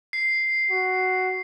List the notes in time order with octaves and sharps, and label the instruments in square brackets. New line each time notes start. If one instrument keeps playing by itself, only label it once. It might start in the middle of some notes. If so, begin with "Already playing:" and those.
[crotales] C7
[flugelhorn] F#4